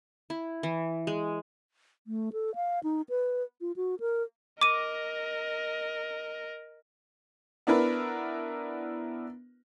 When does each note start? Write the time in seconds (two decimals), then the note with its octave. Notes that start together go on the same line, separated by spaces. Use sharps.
0.30 E4
0.63 E3
1.07 G#3
2.07 A3
2.33 A4
2.55 F5
2.83 D#4
3.09 B4
3.61 F4
3.76 F#4
4.00 A#4
4.61 A#4 D#5 D6 D#7
7.67 B3 D4 E4 A#4 B4